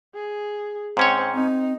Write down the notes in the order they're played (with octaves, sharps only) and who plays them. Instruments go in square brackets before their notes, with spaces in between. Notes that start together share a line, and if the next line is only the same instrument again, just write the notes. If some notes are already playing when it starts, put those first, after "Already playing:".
[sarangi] G#4
[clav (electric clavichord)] G#2 C#4 C#5 [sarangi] C4
[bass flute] C4 [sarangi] D#4